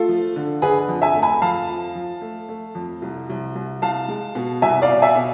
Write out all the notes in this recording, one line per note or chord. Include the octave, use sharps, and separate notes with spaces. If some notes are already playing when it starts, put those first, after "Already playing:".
Already playing: A3 F4 A4
F3
D3
D3 G#4 B4
F2
E5 G#5
A3
G#5 B5
F2 F5 A5
F3
F3
A3
A3
F2
C2
C2
C2
C2 F5 A5
G#3
B2
C2 E5 G#5
D5 F5
B2
E5 G#5
B2